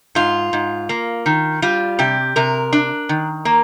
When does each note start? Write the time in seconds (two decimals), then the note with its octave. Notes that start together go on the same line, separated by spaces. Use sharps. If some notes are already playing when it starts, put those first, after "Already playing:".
0.15 G#2 F4
0.53 G#2
0.89 A#3
1.26 D#3
1.62 G3 F4
1.99 C3 G4
2.36 C3 A#4
2.73 D4
3.09 D#3
3.45 A#3